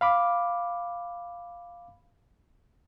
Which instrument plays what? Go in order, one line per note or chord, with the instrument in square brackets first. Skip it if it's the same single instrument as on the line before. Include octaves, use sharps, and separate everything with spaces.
[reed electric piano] F5 B5 D6